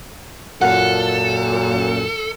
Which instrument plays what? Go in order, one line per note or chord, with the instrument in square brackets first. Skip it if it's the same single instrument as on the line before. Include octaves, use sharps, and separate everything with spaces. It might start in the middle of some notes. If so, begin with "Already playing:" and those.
[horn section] F#2 A#2 [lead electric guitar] A4 [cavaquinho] F5 F#5